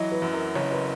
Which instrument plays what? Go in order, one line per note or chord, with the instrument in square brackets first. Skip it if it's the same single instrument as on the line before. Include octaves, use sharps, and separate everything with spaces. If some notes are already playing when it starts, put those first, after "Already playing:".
Already playing: [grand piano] E3 F#3 [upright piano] D#5
[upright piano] B4
[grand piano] F#2
[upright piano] A#4
[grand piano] F#1 [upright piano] C#5
[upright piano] B4